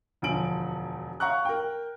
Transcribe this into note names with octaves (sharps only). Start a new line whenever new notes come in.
E1 D2 F3 G#5 D7 F#7
F5 F#5 A#5 C#6 F#6
A#4 G5